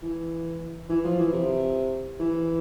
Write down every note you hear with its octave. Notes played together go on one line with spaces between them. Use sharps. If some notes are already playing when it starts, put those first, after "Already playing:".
E3
E3
F3
E3
C3
E3